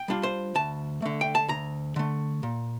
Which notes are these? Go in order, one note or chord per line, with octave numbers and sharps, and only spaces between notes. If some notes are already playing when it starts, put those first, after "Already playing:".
Already playing: G5
G3 D4 F4
C5
D2 A5
D3 A3
G5
A5
D2 A#5
D3 A3
A#2